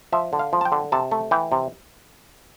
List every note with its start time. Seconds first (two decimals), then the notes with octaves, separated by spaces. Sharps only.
0.12 F3 E5
0.33 D3
0.39 F5
0.53 F3
0.61 A5
0.65 G5
0.72 D3
0.92 C3 A5
1.11 A3
1.31 E3 G5
1.52 C3